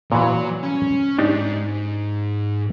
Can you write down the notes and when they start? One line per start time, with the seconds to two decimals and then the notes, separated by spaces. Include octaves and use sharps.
0.12 A#2 E3 F#3
0.63 C#4
1.19 G#2 D4 D#4 G4